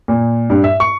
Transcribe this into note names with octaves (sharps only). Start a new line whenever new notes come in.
A#2
G2
E5
C#6